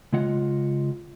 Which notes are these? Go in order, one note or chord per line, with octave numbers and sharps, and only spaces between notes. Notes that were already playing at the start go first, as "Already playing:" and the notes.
C#3 G#3 F4 D#5 F#5